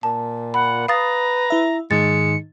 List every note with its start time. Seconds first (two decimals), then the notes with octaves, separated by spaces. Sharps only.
0.03 A#2 A5
0.54 F#5 B5
0.88 B4 F5 A#5 D#6 A6
1.50 E4 E5
1.91 G#2 D#3 G#3 D#4 A6 C#7